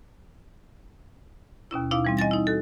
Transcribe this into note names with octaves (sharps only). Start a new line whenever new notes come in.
D#2 B2 C#4 E4
B2 D#4 E4 F5 D6
E3 G3 C4
D#5 G#5 A6 A#6
D#4 E4
F#4 A4